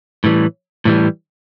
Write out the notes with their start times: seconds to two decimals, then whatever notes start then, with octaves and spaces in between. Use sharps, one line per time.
0.24 A2 E3 G3
0.85 A2 E3 G3